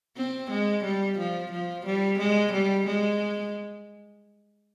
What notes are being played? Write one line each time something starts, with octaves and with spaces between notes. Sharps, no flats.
C4
G#3
G3
F3
F3
G3
G#3
G3
G#3